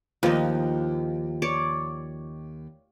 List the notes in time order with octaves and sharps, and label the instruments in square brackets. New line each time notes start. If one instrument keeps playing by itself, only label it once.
[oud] D#2 [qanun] F3 D#4
[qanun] C#5 D5